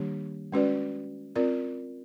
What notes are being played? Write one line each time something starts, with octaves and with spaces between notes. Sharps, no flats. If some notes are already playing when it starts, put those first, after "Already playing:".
Already playing: D#3 G3 A#3 D4 G4
G#3 C#4 F#4 B4 D5
C4 F4 A#4 D5